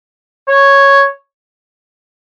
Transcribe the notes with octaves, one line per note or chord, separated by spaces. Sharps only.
C#5